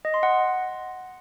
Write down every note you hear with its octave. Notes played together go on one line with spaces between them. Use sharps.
D#5
C6
F#5